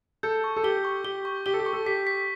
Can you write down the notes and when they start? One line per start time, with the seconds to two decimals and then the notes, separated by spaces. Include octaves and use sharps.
0.23 A4 G6
0.44 C#6
0.57 A4
0.63 G4 G7
0.85 C#6
1.04 G4 G7
1.25 C#6
1.46 G4 G7
1.54 A4
1.59 G4
1.66 C#6
1.73 A4
1.86 G4 B6
2.07 B6